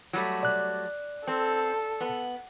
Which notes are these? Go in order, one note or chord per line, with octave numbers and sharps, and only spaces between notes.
F#3 G3 A3
D5 F#6
C4 A4
B3